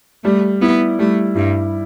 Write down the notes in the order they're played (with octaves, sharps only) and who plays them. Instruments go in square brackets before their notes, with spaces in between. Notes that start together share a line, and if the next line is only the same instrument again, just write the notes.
[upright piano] G3 [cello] A3
[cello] B3 [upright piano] E4
[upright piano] G3 [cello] A3
[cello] G2 [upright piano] E4